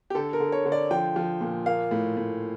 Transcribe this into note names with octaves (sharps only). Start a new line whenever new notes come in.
G4
D3 A4
A#4
D3
C#5
D3
D5
F3 G5
F3
A#2
A#3 F5
A2
A2